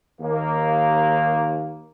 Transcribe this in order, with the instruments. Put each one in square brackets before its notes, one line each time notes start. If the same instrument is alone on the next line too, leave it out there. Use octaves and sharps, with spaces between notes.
[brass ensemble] D#2 A#3